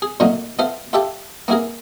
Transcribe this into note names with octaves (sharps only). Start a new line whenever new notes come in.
G#4
A#2 D3 F#3 A3 A#3 D#4
B3 F4 A4 C5 E5 F5
F4 G4 A4 E5 G5 A5
A#3 B3 E4 G#4 A#4